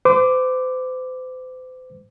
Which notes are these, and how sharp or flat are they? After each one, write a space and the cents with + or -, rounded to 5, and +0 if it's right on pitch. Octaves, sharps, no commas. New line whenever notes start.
C5 -40 D6 +0